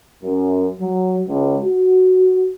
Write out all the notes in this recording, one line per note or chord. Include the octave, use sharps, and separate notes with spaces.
F#2
F#3
C#2
F#4